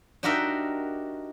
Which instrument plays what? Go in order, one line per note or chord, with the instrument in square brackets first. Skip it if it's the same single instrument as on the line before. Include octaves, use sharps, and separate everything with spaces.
[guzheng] D4 D#4 F#4 G4 A#4 E5